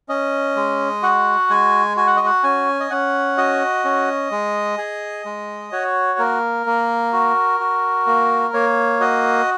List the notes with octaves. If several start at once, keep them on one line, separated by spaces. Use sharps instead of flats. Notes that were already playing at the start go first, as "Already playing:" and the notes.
C#4 D#5
G#3
F#4 F#5
G#3 G#5
F#4 G#5
F#5
D#5
F#5
C#4 G#5
D#5
C#4 F#5
F#4 D#5
C#4
G#3
G#4
G#3
F#4 C#5
A#3 A#4
A#3
F#4
F#4
A#3
A#3 C#5
F#4 D#5